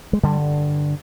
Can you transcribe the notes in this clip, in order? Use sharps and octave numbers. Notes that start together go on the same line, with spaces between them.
G#3
G2 D3 G3